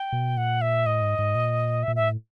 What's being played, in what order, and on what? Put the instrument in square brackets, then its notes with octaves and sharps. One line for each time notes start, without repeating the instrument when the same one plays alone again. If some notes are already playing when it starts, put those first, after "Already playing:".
Already playing: [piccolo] G5
[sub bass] B2
[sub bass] A#2 [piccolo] F#5
[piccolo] E5
[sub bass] A2 [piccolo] D#5
[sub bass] G#2
G#2
A#2
[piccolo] E5
[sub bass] A#2
[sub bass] A2 [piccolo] E5